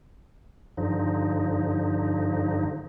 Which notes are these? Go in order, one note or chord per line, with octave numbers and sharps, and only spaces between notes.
G2 D3 F3 D#4